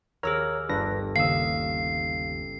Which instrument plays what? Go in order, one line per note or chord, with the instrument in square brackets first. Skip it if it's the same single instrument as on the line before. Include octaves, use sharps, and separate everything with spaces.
[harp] D#2 [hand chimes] G#4 E6 F6 [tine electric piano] A#4 C#5 A#5
[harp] G1 [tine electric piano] D4 B4 A#6
[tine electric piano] D#2 E6 [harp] C#3 D#6 [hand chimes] F5 [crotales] C7